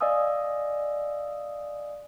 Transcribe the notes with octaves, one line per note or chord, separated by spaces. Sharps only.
D5 D#5 F5 G#5 D#6 E6